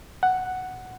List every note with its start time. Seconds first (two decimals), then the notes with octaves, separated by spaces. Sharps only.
0.23 F#5